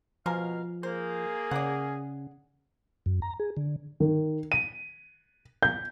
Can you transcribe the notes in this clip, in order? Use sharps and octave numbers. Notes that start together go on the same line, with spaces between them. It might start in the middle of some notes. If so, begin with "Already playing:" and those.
B2 F3 G#3 A#3 A#4 F5
A#3 G#4 C5
C#3 D5 F#5
F#2
A#5
G#4
D3
D#3
D#7
G6